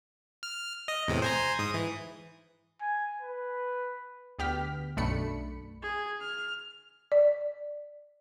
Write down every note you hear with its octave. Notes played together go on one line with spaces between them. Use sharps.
F6
D#5
E2 A2 C3
C5 G#5 A#5
G#2 D#6
E3
G#5
B4
D2 B3 G4 F6 B6
B1 F#2 A3 D4 B5 C#7
G#4
F6
D5